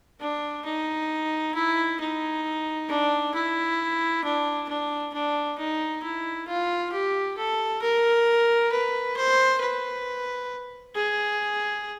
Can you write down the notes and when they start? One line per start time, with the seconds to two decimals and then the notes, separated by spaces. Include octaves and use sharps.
0.20 D4
0.65 D#4
1.55 E4
2.00 D#4
2.89 D4
3.34 E4
4.24 D4
4.69 D4
5.13 D4
5.58 D#4
6.03 E4
6.47 F4
6.92 G4
7.37 A4
7.82 A#4
8.72 B4
9.17 C5
9.61 B4
10.95 G#4